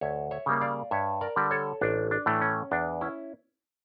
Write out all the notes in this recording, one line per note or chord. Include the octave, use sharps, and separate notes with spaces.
D2 C#5 E5
C#5 E5
C#3 G3 A#3
D5 F5
G2 C#5 E5
A#4 D5
D3 G3
A4 C#5
A1 D4
D4
A2 E3 A3
C#4
E2 D4
C#4 E4